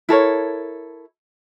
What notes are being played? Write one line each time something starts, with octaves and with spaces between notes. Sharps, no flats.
E4 A4 A#4 C#5